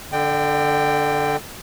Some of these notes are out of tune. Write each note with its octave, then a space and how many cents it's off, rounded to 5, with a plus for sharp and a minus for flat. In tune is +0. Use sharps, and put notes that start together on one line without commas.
D3 +0 D5 +40 G5 +0